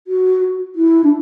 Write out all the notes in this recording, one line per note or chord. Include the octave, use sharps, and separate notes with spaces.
F#4
E4
D4